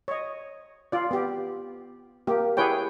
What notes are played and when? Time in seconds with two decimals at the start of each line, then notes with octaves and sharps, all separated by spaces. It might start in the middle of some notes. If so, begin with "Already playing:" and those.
0.08 C#5 D#5
0.92 F4 D5
1.11 B3 G4
2.27 A#3 G4
2.57 E4 G4 G#4 B4 C#5 G5